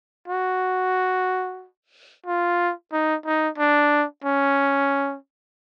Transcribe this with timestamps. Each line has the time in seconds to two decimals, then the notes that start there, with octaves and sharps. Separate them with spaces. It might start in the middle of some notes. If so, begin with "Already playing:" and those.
0.28 F#4
2.26 F4
2.92 D#4
3.25 D#4
3.58 D4
4.24 C#4